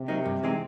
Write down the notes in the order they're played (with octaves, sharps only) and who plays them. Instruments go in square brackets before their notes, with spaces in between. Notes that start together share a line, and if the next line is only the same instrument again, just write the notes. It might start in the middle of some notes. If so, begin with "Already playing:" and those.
Already playing: [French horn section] C3
[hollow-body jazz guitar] F#3 A#3 D#4
G2
E3 G#3 C4 D#4